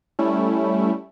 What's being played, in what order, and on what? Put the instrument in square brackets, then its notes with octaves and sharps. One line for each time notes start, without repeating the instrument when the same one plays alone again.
[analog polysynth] G3 A3 C#4 E4